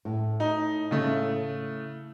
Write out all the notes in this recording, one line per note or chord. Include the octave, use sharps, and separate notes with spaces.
A2
D#4
C#3 A3